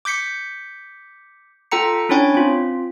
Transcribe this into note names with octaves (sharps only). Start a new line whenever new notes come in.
D6 G6 B6 C#7
F4 A4 G5 A#5 C#7
C#4 D4 E4 C#5 G5 G#5
C4 F4